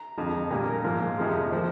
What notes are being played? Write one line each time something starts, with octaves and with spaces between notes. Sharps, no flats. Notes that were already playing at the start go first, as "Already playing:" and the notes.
Already playing: A#5
F2 D3 G#3
A#2 G3 A#3 G#5
A#4
G#2 F3 A#3
F2 C3 F3 G#3
F3 A#3 C5